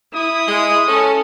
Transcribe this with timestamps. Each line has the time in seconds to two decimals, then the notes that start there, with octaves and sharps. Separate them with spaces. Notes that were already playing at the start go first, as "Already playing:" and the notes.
0.14 E4 D#6
0.48 G#3
0.87 C#4 A4